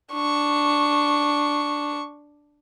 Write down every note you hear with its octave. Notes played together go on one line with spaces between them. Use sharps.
D4 C#6